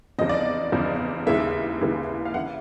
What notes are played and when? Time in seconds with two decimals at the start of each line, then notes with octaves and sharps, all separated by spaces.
0.19 F1 E2 C#3 F3 D#5
0.29 D5
0.40 D#5
0.72 F1 E2 C#3 F3
1.27 D#2 C#3 E3 G#3 E5
1.81 D#2 C#3 E3 G#3
2.25 F5
2.34 C#3 E3 F#5